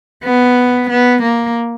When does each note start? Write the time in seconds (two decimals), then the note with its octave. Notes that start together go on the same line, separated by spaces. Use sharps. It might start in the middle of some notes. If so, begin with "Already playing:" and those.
0.24 B3
0.89 B3
1.22 A#3